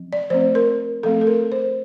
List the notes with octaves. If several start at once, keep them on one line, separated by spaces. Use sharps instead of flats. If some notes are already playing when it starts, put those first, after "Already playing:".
Already playing: F3 C4
D5
F3 A3 C4 C5
A#4
F3 A3 C4 A4
A4
A#4
C5